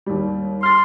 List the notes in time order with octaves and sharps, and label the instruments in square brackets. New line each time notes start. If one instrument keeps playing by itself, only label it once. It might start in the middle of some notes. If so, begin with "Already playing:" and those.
[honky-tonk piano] D#2 G3
[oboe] C6 [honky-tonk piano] F6 A6